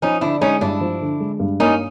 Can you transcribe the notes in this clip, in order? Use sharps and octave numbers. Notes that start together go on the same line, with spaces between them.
F3 C#4 D#4
D3 D4 E4
G#3 C#4 D#4
G2 D4 E4
F3
D3
G#3
G2
A#3 C#4 D#4